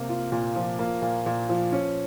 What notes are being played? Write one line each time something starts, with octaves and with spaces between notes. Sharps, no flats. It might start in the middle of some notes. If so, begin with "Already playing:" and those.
Already playing: C3 A#3
F4
A#2
F3
A#3
A#2
A#2
F3
C#4